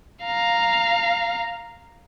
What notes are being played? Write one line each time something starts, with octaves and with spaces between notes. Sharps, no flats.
F5 A#5